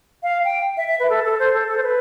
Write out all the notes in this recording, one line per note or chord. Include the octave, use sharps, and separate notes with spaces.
F5
G5
E5
E5
B4
A4
A4
C5
A4
A4
C5
B4